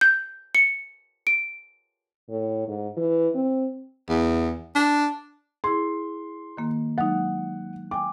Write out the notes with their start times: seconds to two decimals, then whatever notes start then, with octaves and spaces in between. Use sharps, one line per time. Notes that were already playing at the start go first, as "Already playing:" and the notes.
0.01 G6
0.55 C#7
1.27 D7
2.29 A2
2.68 G#2
2.97 E3
3.35 C4
4.09 E2
4.75 D4
5.64 E4 G#4 C6
6.57 D#3 A#3
6.98 F#3 G#3 D#4 F#5
7.91 G5 G#5 D6